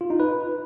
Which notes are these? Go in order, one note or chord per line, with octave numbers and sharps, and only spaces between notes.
F4
D#4
B4